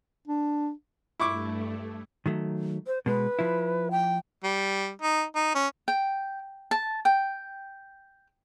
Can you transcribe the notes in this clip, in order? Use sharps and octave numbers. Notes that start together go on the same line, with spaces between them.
D4
G2 A3 E4 C#6 D6
D#3 F#3 A3
C5
B2 G#3 B4
F3 E4
G5
G3
D#4
D#4
C#4
G5
A5
G5